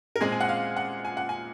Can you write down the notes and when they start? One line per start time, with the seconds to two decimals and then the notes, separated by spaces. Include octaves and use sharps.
0.16 A#4
0.21 A#2 G#3 C4 G#4
0.32 G#5
0.41 F#5
0.49 F5
0.77 F#5
1.05 G#5
1.17 F#5
1.29 G#5